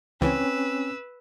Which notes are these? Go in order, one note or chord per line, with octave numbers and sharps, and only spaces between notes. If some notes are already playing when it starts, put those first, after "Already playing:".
C#2 E3 C4 C#4 B4 E6